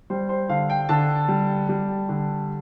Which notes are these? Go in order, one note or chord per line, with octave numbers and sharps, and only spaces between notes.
G3 C5
C5
D3 F5
G5
D3 A5
G3
G3
D3